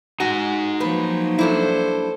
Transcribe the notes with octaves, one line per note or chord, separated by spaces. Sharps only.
D#4 F#4 G#5
F3 F#3 A#3 B4
G2 D4 E4 A4 C5